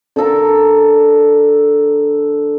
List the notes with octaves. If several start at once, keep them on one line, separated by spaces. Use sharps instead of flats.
D3 D4 A4 A#4